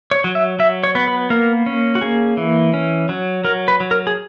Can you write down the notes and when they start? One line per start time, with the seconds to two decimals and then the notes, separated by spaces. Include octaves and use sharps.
0.11 C#5
0.24 F#3
0.35 E5
0.59 F#3 E5
0.83 C#5
0.95 B3
1.08 B4
1.30 A#3 A#4
1.66 C#4
1.95 F#4
2.01 A#3 G#4
2.37 E3
2.73 C#4
3.09 F#3
3.44 F#3 A#4
3.68 B4
3.80 F#3
3.91 A#4
4.07 G#4